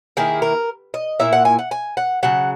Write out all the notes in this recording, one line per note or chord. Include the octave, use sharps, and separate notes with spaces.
D#3 A#3 E4 G#4
A#4
D#5
A#2 A#3 E4 E5
F#5
G#5
F#5
G#5
F#5
C#3 F#3 F#5